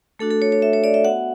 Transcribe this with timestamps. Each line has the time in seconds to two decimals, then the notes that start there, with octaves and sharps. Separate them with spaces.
0.19 A3 D4 F#4 A4
0.31 A4
0.42 C#5
0.52 C#5
0.62 E5
0.73 C#5
0.84 D5
0.94 E5
1.04 B3 F#4 F#5